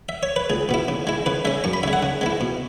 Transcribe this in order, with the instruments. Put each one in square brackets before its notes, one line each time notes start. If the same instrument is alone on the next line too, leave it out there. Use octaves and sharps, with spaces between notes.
[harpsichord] E5
C#5
B4
C#2 G#4
B2 B3 E4
C#3
G#3 E4
C#3 B4
G#3 C#4 E5
F#2 C#6
B5
C#3 G#3 E5
F#5
C#3
G#3 B3 E4
B2